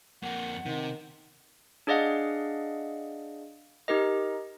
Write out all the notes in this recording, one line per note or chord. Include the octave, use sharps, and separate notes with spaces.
F2 A#3 F#5
C3 D#3
D4 G#4 D5 D#5 F5 F#5
D#4 G4 A#4 D#5